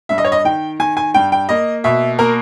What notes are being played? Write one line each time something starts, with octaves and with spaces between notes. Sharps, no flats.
G2 E5
D#5
C#5
D#5
D#3 G5
D#3 G#5
G#5
G2 G5
G5
A#3 D#5
B2 E5
A#3 A#4